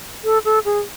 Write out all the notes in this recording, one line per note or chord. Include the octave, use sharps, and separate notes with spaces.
A4
A4
G#4